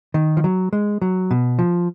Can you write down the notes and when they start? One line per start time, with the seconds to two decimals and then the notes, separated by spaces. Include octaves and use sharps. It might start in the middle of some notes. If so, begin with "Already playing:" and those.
0.14 D#3
0.37 F3
0.44 F#3
0.73 G#3
1.02 F#3
1.31 B2
1.59 F3